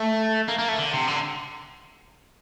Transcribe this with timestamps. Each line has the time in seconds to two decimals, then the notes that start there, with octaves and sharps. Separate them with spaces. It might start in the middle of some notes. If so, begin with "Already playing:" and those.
Already playing: A3
0.48 A#3
0.59 A#3
0.69 A3
0.78 D3
0.93 C3
1.08 D3